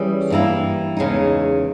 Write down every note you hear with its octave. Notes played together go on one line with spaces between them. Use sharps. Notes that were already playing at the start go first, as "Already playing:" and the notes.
Already playing: E3 G3 C#4 G#4 B4
G2 E3 A#3 E4
E2 C#3 G#3 D#4